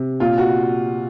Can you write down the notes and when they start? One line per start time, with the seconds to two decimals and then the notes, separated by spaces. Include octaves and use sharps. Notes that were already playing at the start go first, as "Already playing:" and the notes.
Already playing: C3
0.20 A#2 F4
0.38 F#4